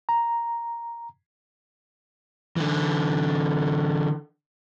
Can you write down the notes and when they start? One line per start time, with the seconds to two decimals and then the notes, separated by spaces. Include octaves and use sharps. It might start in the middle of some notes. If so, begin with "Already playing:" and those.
0.09 A#5
2.56 D3 E3